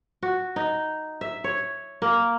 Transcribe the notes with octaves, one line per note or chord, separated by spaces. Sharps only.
F#4
D#4
E5
C#5
A#3